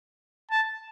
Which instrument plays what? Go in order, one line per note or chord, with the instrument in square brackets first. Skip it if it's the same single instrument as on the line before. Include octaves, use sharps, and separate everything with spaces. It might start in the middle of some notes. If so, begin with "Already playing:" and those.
[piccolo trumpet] A5